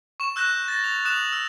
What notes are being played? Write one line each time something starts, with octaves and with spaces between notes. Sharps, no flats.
C#6 E7
E6 F#6 G6 A#6 E7
A6 A#6
F7
D#6 F#6 E7 F7
E6